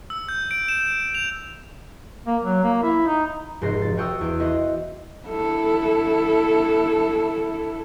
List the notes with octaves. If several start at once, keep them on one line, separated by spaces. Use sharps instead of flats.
E6
G6
D7
E7
F7
A#3
F#3
A#3
E4
D#4
F1 G#2 F#4 C5 A#6 C7
F3 A6
F#4 F5 G5 C#6 D#6 E6
E2 D7
B3 E4 F#4 C5 D#5
E4 A4